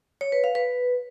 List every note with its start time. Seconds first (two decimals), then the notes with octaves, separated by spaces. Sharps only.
0.21 C#5
0.32 B4
0.44 F5
0.55 B4